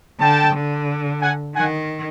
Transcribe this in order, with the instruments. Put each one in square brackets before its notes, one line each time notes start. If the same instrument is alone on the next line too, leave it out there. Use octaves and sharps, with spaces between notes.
[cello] D3 [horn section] G5 A5
[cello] D3
[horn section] F#5 G#5
[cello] D#3 [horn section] F#5 G#5